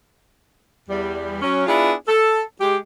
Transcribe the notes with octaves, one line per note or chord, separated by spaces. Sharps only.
E2 G3
F#3 C#4
B3 D4 E4 F4 G#4
A4
G#3 G4